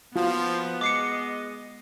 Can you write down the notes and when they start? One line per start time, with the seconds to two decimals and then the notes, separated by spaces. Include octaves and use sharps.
0.16 F3 B3 F4 F#4
0.81 G#3 D#5 D6 C7 C#7